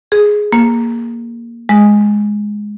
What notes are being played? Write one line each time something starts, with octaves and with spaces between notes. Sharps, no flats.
G#4
A#3
G#3